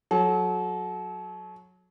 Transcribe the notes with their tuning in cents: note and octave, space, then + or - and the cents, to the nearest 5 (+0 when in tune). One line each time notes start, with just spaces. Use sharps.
F#3 -15 A4 -35